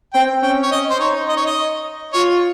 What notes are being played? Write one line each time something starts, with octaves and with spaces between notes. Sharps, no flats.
C4 G5
C#4 G5
C#5
C#4 D#5
C5
D#4 C#5
D#5
C#5
D#5
F4 C#5